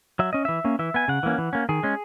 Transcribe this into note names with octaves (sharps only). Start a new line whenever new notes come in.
F#3 E5
C#4 D#5
E3 E5
A#3 C#4
E3 E5
B3 G#5
C#3 F#5
E3 A#3 C#4
E3
A#3 C#4
D#3 G#4
G#3 C#4